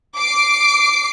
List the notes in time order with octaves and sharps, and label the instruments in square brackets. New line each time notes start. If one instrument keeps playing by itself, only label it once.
[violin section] D6 C7 D7